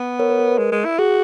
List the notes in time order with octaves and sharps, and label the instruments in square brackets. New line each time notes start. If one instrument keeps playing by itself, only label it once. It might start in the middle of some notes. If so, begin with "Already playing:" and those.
Already playing: [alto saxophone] B3
[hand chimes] A#4 C#5
B4
A#4
[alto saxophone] G#3
G#3
E4
[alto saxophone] F#4 [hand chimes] G#4